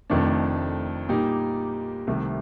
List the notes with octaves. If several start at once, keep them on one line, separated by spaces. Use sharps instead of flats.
F1 F2 D#3 A3 D4
A#2 G3 A#3 D#4 G4
C2 C3 D#3 A3